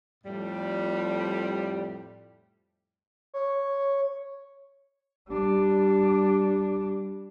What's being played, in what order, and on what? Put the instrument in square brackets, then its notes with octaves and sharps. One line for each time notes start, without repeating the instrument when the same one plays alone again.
[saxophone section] F2 A2 G3
[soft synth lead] C#5
[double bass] G3 D4